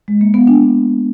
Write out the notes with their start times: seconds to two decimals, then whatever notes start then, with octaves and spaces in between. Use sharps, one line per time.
0.08 G#3
0.21 A#3
0.34 B3
0.47 D4